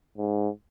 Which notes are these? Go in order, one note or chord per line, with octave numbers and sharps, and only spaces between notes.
G#2